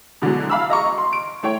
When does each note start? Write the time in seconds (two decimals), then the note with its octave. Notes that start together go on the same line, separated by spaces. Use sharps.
0.22 B2 D3 E3 F#3 G#3
0.50 F5 B5 E6
0.70 D#5 A#5 C#6
0.98 C6
1.13 D7
1.43 A3 E4 C#5 G5